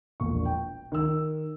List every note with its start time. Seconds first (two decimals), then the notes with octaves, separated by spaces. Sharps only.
0.20 E1 A#1 C#6
0.45 G5
0.92 D#3 E6